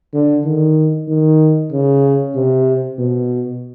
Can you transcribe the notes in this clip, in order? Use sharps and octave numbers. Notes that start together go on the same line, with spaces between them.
D3
D#3
D#3
C#3
C3
B2